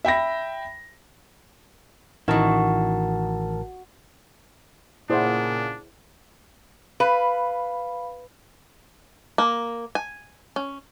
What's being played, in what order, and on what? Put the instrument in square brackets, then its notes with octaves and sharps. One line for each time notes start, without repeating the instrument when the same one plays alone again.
[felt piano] E5 G5 B5 A#6
[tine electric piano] A1 A#4 A5 [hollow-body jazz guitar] D#3 E4 [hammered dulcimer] F#4
[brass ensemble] A#2 C#3 [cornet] D4 [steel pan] E4 C5 D5 [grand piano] G#4 F#5
[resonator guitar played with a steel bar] B4 [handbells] F5 B5
[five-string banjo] A#3
G#5
C#4